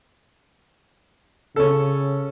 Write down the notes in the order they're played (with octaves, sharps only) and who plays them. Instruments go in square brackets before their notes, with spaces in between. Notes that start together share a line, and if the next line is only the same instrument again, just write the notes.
[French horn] C#3 [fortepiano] C#4 A4